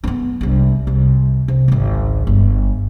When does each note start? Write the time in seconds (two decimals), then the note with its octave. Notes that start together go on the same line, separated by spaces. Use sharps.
0.04 B3 C4
0.41 C2 D3
0.87 C2
1.48 C3
1.68 G#1 C#2
2.27 G1